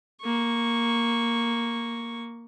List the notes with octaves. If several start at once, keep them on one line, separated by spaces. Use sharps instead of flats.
A#3 C#6